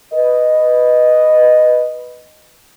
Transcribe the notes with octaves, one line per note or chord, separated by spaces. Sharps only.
B4 D#5